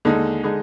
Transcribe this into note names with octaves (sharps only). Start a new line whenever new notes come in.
D#2 D3 G#3 D#4
D3 G#3 D#4